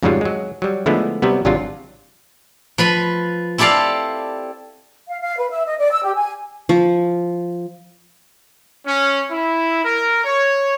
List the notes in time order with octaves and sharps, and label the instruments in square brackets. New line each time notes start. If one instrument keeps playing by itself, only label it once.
[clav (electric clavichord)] F2 G#2 C#3 F#3 G3 F4
F#3 G#3
F#3 G3
D3 F3 G#3 A3 B3 E4
C3 F#3 G3 B3
G#1 C3 F#3 G3 D4 F4
[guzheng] F3 B4 B5
C4 E4 G4 A4 D5 F5
[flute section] F5
F5
B4
E5
D#5
D5
E6
G4
G#5
[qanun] F3
[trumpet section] C#4
E4
A#4
C#5